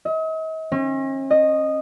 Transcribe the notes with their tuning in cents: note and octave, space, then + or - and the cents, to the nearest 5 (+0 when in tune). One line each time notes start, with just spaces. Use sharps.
D#5 +45
C#4 -45
D#5 -10